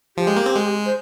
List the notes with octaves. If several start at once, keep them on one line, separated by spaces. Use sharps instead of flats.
F3 G4
G#3
A#3
C4
G#3
C5